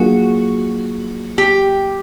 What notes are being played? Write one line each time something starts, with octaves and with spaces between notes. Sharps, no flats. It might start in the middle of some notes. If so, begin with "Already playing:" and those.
Already playing: F#3 A#3 D4 F4 F#4 G#4
G4